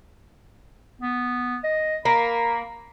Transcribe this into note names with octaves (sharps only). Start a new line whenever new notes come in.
B3
D#5
A#3 B5